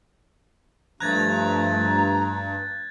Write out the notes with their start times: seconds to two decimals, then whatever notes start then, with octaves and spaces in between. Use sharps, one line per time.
1.00 G2 F3 A3 A#5 F#6 G#6 A6